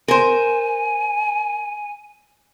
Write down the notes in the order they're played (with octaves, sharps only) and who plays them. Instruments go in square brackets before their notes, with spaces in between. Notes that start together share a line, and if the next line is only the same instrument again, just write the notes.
[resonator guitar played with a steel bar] A#4 C5 [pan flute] G#5